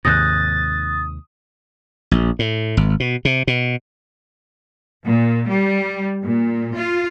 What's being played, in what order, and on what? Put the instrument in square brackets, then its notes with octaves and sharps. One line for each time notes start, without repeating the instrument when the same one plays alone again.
[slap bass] D#2 G#2 C3 [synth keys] D#6 [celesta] F#6 G6 A#6 [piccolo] A6
[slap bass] A#1
A2
G#1
B2
C3
B2
[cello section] A#2
G3
A#2
F4